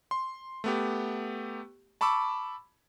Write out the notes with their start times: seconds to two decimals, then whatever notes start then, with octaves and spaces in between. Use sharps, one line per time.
0.11 C6
0.64 A3 B3 G4
2.01 A5 B5 C#6 D6 E6